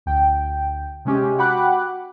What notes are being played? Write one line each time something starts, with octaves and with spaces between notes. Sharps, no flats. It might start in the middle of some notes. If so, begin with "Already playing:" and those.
D2 G5
C3 G#3 C#4 G4
F#4 F#5 G5 B5 D6 F#6